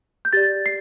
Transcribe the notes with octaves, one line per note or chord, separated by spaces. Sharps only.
G6
G4 D5 A6
C7